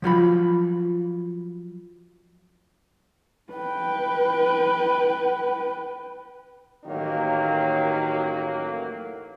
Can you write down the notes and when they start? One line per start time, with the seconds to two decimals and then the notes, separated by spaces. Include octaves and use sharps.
0.02 F3 F#3 F4 B5
3.52 B4 G5
6.86 A1 D#3 F#3 A#3